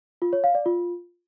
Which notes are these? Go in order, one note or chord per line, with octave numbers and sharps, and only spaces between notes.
F4
C#5
F5
D5
F4